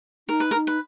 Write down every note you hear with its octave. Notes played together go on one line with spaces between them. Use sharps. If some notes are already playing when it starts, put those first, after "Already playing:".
D#4 A#4
B4
A#4
D#4
B4